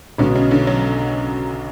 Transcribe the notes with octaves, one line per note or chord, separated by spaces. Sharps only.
B1 B2 D3 G#3 C#4
C#3
D3
F#3